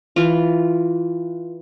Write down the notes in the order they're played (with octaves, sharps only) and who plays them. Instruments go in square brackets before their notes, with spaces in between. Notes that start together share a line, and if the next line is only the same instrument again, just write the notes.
[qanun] E3 F4